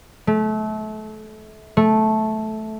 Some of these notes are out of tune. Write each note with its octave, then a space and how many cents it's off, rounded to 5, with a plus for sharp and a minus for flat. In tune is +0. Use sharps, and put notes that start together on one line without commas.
A3 -30
A3 -10